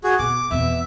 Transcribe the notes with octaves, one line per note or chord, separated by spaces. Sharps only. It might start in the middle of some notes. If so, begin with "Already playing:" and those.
F#4 G#4
B2 D6
E2 B2 E5